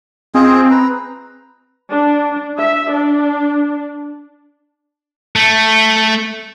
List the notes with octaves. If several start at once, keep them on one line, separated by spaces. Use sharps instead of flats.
C4 F4 G#4 D#5
B4 A#5
D4
E5
D4
A3